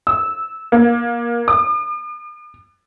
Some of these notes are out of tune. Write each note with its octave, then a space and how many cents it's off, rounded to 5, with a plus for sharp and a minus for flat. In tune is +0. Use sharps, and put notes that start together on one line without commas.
E6 -15
A#3 +25
D6 +40